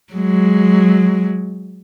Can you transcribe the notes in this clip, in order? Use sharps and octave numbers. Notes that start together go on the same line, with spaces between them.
F#3 G#3